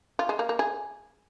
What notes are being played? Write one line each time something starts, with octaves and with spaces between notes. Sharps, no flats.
F4
G#3
A#3
A#3
G#4